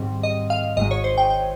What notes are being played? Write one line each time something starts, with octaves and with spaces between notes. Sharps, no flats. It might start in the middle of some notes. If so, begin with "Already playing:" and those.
Already playing: G#2 D#3 G3 C4
D#5
F5
G#1 G#2 D#3 G#3 D#5
C#5
C5
G5
G5